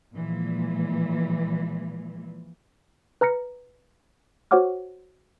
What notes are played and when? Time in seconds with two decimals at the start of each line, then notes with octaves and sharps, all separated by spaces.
0.13 A#2 E3 F3 G#3
3.21 B4 A#5 F6 A#6 C#7
4.51 F#4 C5 C#5 F#5 D6 F6